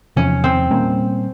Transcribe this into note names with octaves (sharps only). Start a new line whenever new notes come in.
E2 C3 F3 C#4
C4
A#2 G3 A#3 C#4